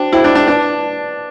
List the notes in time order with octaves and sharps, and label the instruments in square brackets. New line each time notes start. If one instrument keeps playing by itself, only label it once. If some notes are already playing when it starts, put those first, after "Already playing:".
Already playing: [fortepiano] D4 [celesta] F#4 C5 G5
[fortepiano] E4 [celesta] F#4 C5 G5
[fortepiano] D4
D4
[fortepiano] D4 [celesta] B4 D5 A5